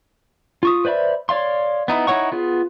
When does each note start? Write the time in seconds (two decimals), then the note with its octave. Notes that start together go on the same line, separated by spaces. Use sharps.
0.63 F4 C#6 D#6
0.85 B4 C5 D5 E5 B5
1.29 C#5 D5 F5 C6
1.88 B3 D#4 E4
2.07 D#4 E4 C#5 F#5 C#6
2.32 B3 F4 G#4